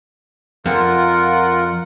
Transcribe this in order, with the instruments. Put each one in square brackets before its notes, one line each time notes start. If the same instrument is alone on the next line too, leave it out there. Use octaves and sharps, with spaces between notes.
[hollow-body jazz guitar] F2 [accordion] F4 A#4 F#5